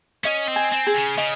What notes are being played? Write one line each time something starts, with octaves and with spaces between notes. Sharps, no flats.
C#4 D#5
C4
G#5
C4
G#4
C#3
C#3 D#5